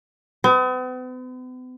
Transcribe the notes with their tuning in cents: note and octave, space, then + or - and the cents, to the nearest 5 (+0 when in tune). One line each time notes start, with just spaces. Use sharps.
B3 +45